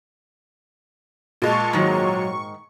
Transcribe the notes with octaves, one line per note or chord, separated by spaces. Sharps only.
A#2 G#3 A5 C#6
G#2 D#3 F#3 C#6